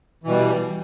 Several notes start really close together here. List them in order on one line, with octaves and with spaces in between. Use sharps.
E3 B2 G3